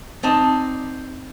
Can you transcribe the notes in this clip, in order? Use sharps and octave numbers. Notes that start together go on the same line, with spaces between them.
C4 D#4 D5 A5 D#6